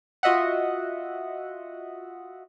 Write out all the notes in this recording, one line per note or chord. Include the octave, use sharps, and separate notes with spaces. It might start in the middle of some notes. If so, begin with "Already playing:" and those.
F4 F#4 D#5 E5 F#5